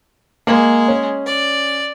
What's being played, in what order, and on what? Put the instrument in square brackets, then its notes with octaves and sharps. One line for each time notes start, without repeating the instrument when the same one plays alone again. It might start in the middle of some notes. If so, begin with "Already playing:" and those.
[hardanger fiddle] G#3 [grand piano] A#3 F#7
[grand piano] C#4
[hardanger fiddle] D5